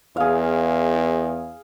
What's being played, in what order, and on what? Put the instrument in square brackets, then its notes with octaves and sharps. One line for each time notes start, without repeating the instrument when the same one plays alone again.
[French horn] E2 [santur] G#4 F5